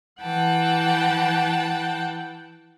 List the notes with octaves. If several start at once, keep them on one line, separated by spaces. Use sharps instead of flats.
E3 F#5 G5 A5